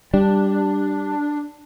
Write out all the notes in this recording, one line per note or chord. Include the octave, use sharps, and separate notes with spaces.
G3 D4